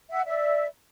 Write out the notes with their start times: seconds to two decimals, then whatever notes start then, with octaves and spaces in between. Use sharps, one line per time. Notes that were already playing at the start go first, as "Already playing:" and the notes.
0.10 E5 F#5
0.25 D5 E5